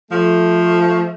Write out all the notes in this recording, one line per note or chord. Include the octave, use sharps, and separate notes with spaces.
F3 A3